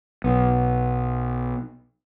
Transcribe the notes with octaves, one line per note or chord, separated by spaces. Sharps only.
B1 B3